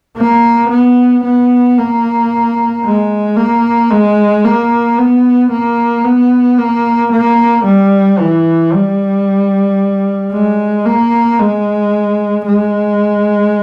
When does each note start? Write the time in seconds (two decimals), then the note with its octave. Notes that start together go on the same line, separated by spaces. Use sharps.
0.17 A#3
0.70 B3
1.24 B3
1.78 A#3
2.85 G#3
3.37 A#3
3.91 G#3
4.45 A#3
4.98 B3
5.52 A#3
6.05 B3
6.58 A#3
7.12 A#3
7.65 G3
8.19 E3
8.72 G3
10.32 G#3
10.86 A#3
11.39 G#3
12.45 G#3